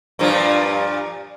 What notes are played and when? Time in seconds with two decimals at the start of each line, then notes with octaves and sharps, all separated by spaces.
0.19 G2 A#2 F3